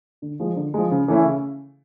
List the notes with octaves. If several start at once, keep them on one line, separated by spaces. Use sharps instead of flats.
D3
F3 G#3
D3
F3 G#3
C#3
E3 A3 C#4 E4
C#3